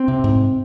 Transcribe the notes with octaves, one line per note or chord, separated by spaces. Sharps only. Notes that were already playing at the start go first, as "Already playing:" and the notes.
Already playing: C4
C3
G#2